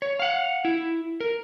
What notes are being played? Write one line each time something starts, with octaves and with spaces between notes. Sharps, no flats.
C#5
F5 F#5
E4
A#4